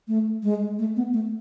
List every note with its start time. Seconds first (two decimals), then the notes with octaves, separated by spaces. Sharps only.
0.08 A3
0.43 G#3
0.79 A3
0.96 B3
1.13 A3